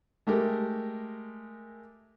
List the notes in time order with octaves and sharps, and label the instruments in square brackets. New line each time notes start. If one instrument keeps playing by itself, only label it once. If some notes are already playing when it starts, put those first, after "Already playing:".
[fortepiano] G#3 A3 G4 A#4